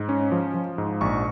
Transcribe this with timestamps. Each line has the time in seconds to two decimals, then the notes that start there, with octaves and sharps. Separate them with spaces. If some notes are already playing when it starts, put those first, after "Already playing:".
Already playing: G#2
0.09 C#4
0.32 F3
0.54 F3
0.78 G#2
1.01 A#1 C#6